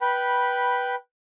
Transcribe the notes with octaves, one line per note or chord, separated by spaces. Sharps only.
B4 G5 B5